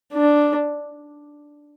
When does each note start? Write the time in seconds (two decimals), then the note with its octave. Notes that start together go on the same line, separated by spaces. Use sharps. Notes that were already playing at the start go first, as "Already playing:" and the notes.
0.13 D4